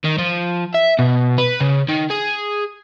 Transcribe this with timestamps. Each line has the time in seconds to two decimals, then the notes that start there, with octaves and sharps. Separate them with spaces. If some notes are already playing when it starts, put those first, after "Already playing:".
0.05 D#3
0.18 F3
0.74 E5
0.99 B2
1.38 B4
1.60 C#3
1.88 D#3
2.10 G#4